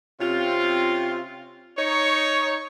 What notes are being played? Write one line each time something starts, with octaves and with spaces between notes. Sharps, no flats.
C3 C4 C#4 F4
D#4 C#5